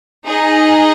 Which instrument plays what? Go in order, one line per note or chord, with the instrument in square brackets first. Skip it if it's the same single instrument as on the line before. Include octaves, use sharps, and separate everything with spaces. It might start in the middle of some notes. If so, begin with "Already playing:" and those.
[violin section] D#4 G#4 D#5